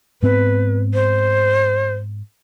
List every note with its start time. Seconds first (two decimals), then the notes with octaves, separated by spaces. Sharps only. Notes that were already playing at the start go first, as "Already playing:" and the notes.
0.23 G#2 B3 C4 B4
0.94 C5